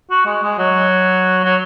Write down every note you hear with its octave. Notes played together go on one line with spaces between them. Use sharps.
F#4
G#3
G#3
F#3
F#3